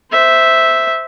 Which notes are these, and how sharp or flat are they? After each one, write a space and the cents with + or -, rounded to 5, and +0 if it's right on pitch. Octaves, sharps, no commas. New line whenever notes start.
C5 -10 E5 -5